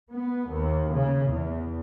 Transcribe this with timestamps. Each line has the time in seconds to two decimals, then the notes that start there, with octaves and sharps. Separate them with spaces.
0.12 B3
0.51 D#2
0.94 C#3
1.29 E2